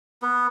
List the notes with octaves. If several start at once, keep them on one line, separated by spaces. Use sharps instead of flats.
B3